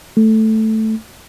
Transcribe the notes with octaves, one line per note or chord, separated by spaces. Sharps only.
A3